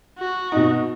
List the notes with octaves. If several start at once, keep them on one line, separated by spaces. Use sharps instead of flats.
F#4
B2 D#4